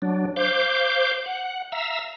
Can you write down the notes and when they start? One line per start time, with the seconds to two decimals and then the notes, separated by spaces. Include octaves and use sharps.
0.02 F#3 D4
0.36 C5 F5 D6 G6
1.26 F#5
1.72 E5 F5 A#5 E6